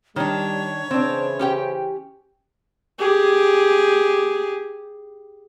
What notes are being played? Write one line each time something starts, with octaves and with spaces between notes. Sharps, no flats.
D#3 G3 D4 C#5
C#3 E3 C4 D4 C5
C#4 G4 G5
G4 G#4